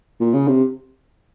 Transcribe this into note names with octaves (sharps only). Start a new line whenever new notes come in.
A#2
C#3
C3